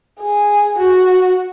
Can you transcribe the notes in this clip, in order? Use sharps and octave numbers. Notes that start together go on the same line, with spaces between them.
G#4
F#4